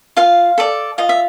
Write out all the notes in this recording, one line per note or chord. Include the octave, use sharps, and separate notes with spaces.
F4 F5
A4 D5
F4 D#5
E5